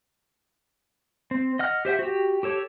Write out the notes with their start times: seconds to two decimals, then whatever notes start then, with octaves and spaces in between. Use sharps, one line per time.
1.31 C4
1.59 D#5 F#5 F6
1.85 G4 C5 E5 F#5
1.99 F#4 G4
2.43 G4 A4 C#5